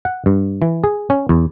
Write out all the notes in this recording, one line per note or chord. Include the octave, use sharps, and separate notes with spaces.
F#5
G2
E3
G#4
C#4
E2